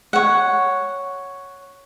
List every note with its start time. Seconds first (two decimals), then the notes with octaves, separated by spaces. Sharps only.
0.13 C#5 F#5